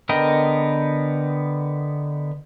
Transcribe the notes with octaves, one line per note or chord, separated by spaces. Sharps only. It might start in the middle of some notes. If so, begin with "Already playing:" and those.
D3 B3 A#4 D#5 G5